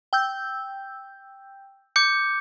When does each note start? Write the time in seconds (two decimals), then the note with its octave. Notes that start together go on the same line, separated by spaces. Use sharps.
0.13 G5 E6 G6
1.96 D6 G6 C#7